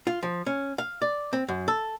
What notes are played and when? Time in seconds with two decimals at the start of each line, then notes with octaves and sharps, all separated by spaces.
0.07 F4
0.23 F3
0.46 C#4
0.78 F5
1.02 D5
1.33 C4
1.48 F#2
1.68 A4